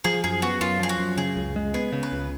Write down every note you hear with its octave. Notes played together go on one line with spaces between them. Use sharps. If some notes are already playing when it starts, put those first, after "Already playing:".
F3 G#4
F#2 G#4
B3 F#4
F#2 F4
F3 G#4
F#4
F#2
C#3 G#4
C#2
G#3
B3 G#4
C#3
B4
C#2